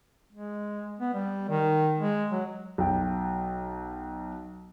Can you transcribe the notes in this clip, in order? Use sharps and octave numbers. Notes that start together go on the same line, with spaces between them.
G#3
B3
G3
D#3
G#3
F#3
B1 G5